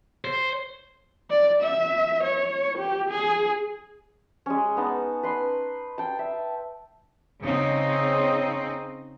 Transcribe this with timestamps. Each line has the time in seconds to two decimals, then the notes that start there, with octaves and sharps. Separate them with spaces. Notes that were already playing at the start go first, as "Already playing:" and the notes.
0.25 C5
1.30 D5
1.62 E5
2.24 C#5
2.78 G4
3.10 G#4
4.46 G#3 C#4
4.77 B3 D#4 A5
5.23 B4 C6
5.98 G5 A5
6.19 E5
7.43 C#3 C4 D#4